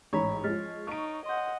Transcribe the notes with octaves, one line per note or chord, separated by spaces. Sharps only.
A1 G#2 C#5 A#5 B5 B6
F3 G#3 F6 A6 B6
D#4 C#6 D7
D#5 F#5 C6 G6